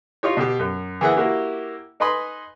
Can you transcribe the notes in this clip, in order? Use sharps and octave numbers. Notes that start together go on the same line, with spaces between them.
D#4 F4 G4 C#5
B2 G4
F#2
E3 A#3 G#4 E5 F#5
A#3 E4 F#4 G4
D#4 B4 D#5 G#5 B5 C6